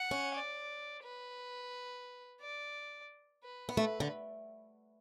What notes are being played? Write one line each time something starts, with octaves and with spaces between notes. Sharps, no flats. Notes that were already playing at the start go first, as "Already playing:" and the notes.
Already playing: F#5
C#4
D5
B4
D5
B4
B3
A3 B4
D3